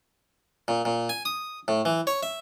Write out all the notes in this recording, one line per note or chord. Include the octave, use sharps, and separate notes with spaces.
A#2
A#2
G#5
D#6
A2
E3
C#5
E5